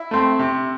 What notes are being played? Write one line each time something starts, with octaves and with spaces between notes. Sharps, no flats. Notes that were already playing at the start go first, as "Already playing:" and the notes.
Already playing: E4
A3 C4
C3